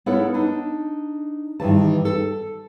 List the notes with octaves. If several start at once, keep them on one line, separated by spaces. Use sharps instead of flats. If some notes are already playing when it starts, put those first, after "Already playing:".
B3 E4 A4 A#4 C#5 F#5
D4 D#4
G2 D#3 E3 A5
A4